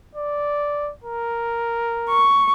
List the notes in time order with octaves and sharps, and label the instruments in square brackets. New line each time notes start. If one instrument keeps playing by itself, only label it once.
[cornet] D5
A#4
[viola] C#6